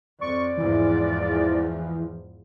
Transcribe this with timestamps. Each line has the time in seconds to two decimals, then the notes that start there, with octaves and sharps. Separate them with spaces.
0.21 F2 D5 C#6
0.57 E2 G#2 E3 F3